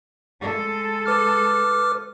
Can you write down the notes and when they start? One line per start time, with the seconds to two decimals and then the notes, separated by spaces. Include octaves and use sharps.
0.41 G#3 A4
1.06 B4 D6 F6